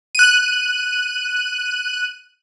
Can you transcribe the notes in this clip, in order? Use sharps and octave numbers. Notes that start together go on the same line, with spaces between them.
F#6 D#7